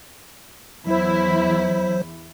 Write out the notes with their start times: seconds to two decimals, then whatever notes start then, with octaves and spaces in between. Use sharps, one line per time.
0.87 E2 F#3 E4 C5